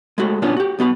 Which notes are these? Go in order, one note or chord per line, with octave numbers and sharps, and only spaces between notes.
G#3 A3 F#4
A#2 A#3 B3 C#4 D4 F4
F#4 G4
B1 B3 F#4 B5